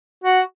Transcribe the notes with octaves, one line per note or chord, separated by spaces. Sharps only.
F#4